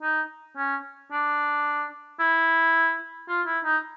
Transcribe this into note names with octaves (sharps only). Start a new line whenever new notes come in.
D#4
C#4
D4
E4
F4
E4
D#4